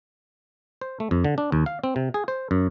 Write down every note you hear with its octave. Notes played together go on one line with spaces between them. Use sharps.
C5
A3
F2
D3
D4
D#2
F5
C4
C3
G#4
C5
F#2